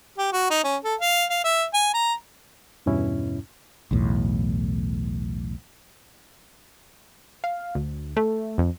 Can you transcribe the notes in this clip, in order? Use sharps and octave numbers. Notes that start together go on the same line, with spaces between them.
G4
F#4
D#4
C#4
A4
F5
F5
E5
G#5
A#5
E2 G2 B2 C#4 E4
B1 E2 A2
F5
D2
A3
F2